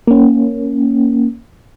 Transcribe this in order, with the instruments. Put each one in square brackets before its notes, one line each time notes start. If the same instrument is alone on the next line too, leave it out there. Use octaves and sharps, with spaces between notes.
[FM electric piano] A#3 C#4